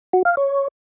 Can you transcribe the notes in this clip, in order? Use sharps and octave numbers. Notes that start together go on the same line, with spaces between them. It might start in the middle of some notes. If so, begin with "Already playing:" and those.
F#4
F5
C#5